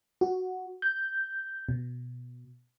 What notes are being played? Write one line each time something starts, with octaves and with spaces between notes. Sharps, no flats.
F#4
G6
B2